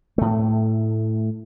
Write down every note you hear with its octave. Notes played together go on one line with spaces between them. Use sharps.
A2 A3